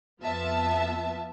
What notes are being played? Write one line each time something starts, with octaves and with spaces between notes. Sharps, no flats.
F2 B3 F4 E5 A5